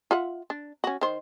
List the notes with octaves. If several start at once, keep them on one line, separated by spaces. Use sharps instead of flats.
F4 E5 F#5
D4
C#4 F#4
D#3 C5